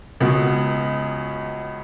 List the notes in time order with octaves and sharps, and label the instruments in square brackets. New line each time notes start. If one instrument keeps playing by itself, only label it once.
[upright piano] C#2 C#3 G#3 B3 F#4